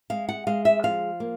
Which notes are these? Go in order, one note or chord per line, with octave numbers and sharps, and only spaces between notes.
G#3 F5
F#5
G#3 F5
E5
F3 F5
A#3